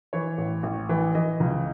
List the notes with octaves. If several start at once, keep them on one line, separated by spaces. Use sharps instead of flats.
E3 C#5
A1
A1
E3
E3 D#5
C#2